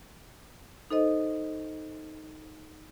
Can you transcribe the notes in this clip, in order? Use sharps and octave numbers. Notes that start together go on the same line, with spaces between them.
D#4 A4 C5 D#5